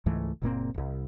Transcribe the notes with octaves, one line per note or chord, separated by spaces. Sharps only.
C#2 G#2 E3 A3
F#1 A#2 A#3 C4
D#1 C2